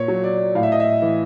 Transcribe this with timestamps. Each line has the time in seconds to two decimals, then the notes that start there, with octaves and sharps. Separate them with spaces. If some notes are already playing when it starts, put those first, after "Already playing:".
Already playing: A#2 C#5
0.08 F#3
0.24 D5
0.55 A2 F5
0.63 E5
0.72 D#5
0.80 E5
1.02 E3